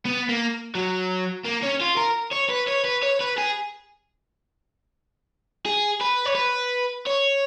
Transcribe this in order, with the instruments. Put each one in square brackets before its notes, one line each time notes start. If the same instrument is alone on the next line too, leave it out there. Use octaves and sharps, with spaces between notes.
[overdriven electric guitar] B3
A#3
F#3
A#3
C#4
F4
A#4
C#5
B4
C#5
B4
C#5
B4
G#4
G#4
B4
C#5
B4
C#5